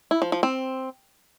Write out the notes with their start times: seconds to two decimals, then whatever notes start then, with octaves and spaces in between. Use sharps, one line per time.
0.11 E4
0.22 F3
0.32 F3
0.43 C4